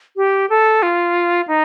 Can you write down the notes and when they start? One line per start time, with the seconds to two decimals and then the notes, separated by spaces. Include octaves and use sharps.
0.16 G4
0.50 A4
0.82 F4
1.48 D#4